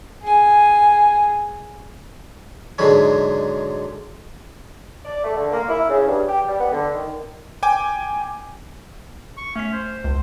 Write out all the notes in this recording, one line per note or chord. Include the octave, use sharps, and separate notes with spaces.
G#4 G#5
G#2 B2 D3 F#3 G#3
D5
A3
D3
A#3
E4
C#3
G2
G4
G3
B3
D3
D#3
G5 G#5 D6
C#6
A3 C#4 B6
C5
C#2